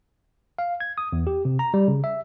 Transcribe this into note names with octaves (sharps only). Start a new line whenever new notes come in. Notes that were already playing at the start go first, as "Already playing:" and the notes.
F5
G#6
D#6
E2
G4
C3
A#5
G3
C#3
E5